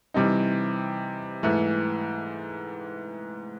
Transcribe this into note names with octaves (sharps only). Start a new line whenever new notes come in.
C3 E3 G3 C4 D#4
G#2 E3 A3